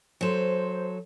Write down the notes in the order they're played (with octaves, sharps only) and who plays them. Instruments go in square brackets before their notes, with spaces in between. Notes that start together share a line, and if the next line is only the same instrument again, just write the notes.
[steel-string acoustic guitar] F#3 A4 [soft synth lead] C5